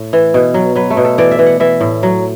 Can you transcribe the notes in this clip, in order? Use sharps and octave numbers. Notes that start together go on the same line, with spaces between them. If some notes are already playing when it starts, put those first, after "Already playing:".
Already playing: A2
E3
B2
F#3
F#3 B4
A3
B2
A4
E3 D5
E5
E3
F#5
E3 E5
A2
F#3